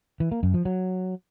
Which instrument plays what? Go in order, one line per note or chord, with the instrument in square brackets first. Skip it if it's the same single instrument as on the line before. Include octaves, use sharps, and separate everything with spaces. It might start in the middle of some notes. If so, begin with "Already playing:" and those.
[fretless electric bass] E3
A#3
F#2
F3
F#3